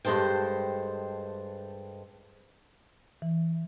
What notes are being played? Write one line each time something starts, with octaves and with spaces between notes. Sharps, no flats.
G2 G#3 A4 C5 G5
E3